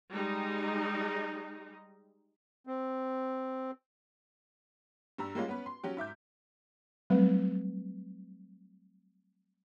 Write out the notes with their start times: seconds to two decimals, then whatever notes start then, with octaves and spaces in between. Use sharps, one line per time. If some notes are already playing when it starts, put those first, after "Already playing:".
0.14 G3 G#3 D#4
2.67 C4
5.18 G2 G3 A#5 E6
5.35 G3 G#3 A#3 C#4 F4
5.48 B3 C#4 B4
5.66 C6
5.84 F#3 C#4 G4
5.97 G#2 E5 D6 G6
7.10 F#3 G3 A3 C4 B4